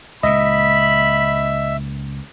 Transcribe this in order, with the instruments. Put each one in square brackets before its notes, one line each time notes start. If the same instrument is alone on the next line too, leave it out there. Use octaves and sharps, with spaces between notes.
[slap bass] C#2 A#2 [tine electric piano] D#5 [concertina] E5 [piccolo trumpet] B5